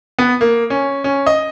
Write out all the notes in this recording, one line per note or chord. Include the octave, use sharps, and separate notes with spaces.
B3
A#3
C#4
C#4
D#5